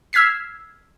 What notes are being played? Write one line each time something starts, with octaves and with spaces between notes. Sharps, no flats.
E6 F6 G#6 B6 C7